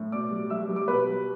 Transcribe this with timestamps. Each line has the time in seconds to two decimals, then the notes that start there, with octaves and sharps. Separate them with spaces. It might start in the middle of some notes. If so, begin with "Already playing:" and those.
Already playing: A2
0.12 B2 D5 D6
0.31 G3
0.50 G3 E5 E6
0.69 G3
0.76 D6
0.88 B2 B4 B5
1.07 G3